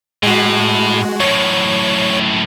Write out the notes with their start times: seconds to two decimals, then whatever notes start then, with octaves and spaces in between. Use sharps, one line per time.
0.23 A2 G#3 F#4
1.20 F#2 A2 C#5